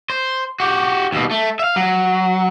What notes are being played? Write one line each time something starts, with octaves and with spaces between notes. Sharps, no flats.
C5
F#4 G4
D#2 B2
A3
E5 F5
F#3